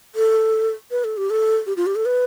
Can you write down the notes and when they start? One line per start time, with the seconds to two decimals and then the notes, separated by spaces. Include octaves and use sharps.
0.15 A4
0.91 B4
1.04 A4
1.17 G4
1.30 A4
1.66 G4
1.77 F4
1.86 G4
1.95 A4
2.05 B4